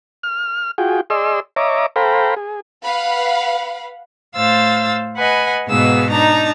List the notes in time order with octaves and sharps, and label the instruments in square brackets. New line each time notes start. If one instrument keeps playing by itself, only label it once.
[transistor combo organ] F6
F4 F#4 G#4 G5
G#4 D5 D#5 C6 E6
C#5 D#5 E5 A#5 D6
A4 C5 F5 G5 A#5 B5
G#4
[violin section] B4 F5 F#5 B5
[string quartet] A2 C5 F5 E6 A6
B4 D#5 F#5 G#5 B5
G#2 B2 B3 G#4 F5 E6
D4 D#4 A5 A#5